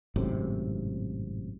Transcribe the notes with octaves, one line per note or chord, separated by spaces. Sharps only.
G#1 F#2 A2 C3